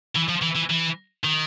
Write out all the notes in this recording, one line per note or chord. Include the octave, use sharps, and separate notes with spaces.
E3
F3
E3
E3
E3
D#3